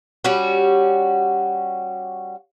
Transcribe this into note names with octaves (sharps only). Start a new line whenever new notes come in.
G3 C#4 F#4